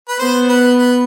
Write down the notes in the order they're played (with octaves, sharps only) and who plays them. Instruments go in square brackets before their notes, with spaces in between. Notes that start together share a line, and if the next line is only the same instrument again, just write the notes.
[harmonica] B4
[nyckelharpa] B3 [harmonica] C5
[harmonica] B4
B4